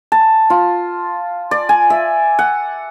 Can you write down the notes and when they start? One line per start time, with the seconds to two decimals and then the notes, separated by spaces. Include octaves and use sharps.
0.12 A5
0.50 F4
1.51 D5
1.69 G#5
1.90 E5
2.39 F#5